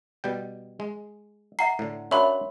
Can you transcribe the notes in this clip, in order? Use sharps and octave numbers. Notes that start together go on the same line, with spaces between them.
B2 G3 G5
G#3
E5 F#5 A#5 C7
A2 D3
C#4 D4 F#4 A#4 C#5 E5 B5 C6